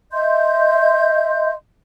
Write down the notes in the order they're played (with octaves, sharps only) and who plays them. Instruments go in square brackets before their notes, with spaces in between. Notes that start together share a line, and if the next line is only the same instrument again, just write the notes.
[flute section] D#5 E5 C6 G6